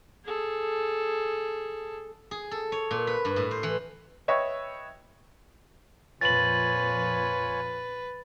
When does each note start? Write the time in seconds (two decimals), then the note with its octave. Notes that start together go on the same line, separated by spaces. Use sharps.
0.25 G#4 A4
2.31 G#4
2.51 A4
2.72 C#5
2.91 A#2
3.07 B4
3.25 G2
3.36 A2
3.51 C5
3.63 E3
4.28 B4 C#5 D#5 E5 G5 C#6
6.21 F2 A#2 F4 B4 C#5 G#5 A6 F#7